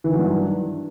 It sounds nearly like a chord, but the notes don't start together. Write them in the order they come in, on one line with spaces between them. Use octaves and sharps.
E3 D#3 F#3 G2